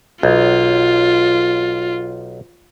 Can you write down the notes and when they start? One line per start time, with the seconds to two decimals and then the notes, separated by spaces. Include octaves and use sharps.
0.23 B1 F4